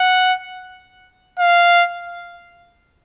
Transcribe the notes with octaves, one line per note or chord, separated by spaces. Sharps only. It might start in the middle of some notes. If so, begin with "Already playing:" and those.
Already playing: F#5
F5